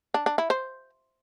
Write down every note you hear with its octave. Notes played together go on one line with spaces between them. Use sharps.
D4
D4
E4
C5